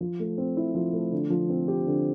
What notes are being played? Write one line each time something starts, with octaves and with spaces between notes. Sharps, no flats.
F3
A3
C4
E4
F3
A3
D3
F3
C4
G4
D3